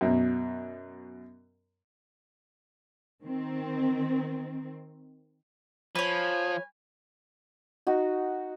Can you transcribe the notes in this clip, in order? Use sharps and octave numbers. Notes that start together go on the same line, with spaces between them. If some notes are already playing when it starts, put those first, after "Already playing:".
F#2 B2
D#3 C4
F3 B4 C#5 G#5
D#4 F#4